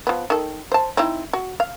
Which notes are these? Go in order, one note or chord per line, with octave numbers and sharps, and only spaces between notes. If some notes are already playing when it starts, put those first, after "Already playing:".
F3 B3
D#3 A4
C5 A5
C4 D#4 E4
F#4
F5